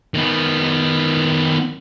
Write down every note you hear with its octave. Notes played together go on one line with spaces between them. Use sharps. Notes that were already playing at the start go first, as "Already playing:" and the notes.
D#3 B3